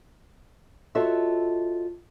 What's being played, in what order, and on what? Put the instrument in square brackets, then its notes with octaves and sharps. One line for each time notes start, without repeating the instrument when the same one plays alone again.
[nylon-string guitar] F4 F#4 A4 C#5 D#5 E5